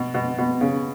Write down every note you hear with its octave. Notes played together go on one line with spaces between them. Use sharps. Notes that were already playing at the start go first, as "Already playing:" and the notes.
Already playing: B2
B2
B2
C#3